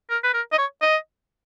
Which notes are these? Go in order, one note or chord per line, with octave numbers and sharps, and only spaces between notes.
A#4
B4
A#4
D#5
C#5
D#5